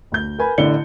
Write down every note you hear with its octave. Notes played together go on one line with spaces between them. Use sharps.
D2 G6
A#4 B4 G#5 B5
A1 D3 E4 D5 C#7 G7